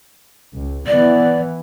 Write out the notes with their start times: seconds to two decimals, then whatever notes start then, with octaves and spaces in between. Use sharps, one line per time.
0.53 C#2
0.87 E3 B3 D5